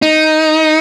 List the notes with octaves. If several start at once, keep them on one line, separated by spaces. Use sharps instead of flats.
D#4